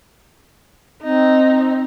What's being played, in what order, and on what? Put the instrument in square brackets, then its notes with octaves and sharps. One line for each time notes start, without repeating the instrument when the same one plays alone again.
[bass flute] C4 [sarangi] D#4